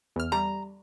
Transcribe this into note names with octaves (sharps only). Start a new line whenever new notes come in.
E2 F6
G3 A#5